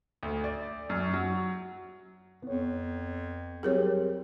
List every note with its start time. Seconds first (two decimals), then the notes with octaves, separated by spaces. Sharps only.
0.23 D2
0.44 D5
0.90 F#2
1.13 F#3
2.42 F2 B3 C#5
3.63 F#3 G3 C4 G#4 A#4 C#5